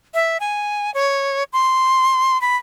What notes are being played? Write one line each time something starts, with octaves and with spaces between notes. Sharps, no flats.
E5
G#5
C#5
C6
B5